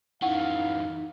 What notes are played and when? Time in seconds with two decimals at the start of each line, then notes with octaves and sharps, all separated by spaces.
0.22 F#2 E3 D#4 F5 F#5